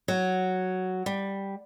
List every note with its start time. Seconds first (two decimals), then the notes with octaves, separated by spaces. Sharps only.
0.08 F#3
1.06 G3